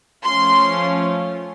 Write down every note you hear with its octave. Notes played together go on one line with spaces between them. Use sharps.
F3 A3 C#4 F4 C6